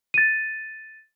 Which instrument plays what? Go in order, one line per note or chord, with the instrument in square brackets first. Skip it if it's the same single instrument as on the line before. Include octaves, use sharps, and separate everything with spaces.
[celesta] A6 D#7